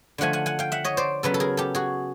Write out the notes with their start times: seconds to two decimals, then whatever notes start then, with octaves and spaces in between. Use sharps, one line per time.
0.18 D3 F3 A3 F#5 G#5
0.33 F#5 G#5
0.46 F#5 G#5
0.59 F5 G5
0.72 E5 F#5
0.84 C#5 D#5
0.97 C5 D5
1.23 C#3 F#3 B3 A4 B4
1.34 A4
1.40 G#4 A#4
1.57 G4 A4
1.75 F#4 G#4